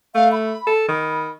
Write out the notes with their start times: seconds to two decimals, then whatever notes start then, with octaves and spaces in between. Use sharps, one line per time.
0.15 A3 F5
0.32 B5
0.67 A4
0.88 D#3 B5